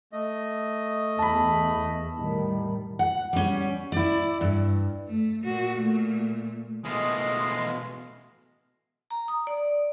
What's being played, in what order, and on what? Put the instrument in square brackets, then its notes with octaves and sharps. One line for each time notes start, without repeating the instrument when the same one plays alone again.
[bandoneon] A3 D#5
[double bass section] E2 [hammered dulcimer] A5 B5
[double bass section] A2 D#3 G3
[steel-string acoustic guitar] F#5
G3 C#4
E4 D5
G2
[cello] A3
A#2 F#4
A#2 A3
[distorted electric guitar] B2 A3 [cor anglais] G#3 [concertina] D#5 F5 C6
[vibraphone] A#5
D#6
D5